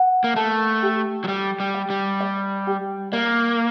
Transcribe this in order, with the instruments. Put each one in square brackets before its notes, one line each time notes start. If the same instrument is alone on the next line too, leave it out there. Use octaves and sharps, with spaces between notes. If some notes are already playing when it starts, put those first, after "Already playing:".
Already playing: [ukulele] F#5
[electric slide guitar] A#3
[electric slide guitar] A3 [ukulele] A5
[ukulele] G4
[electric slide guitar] F#3
[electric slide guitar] G3 [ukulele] G5
[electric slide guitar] G3
[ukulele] G5
[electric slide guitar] G3
[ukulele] D5
G4
[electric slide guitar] A#3 [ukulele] D5